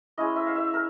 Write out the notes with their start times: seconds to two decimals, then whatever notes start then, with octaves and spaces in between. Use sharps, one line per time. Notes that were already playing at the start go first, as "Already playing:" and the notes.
0.18 G#3 C#4 E4 D#5
0.36 E5
0.47 F5
0.55 E5
0.73 A#4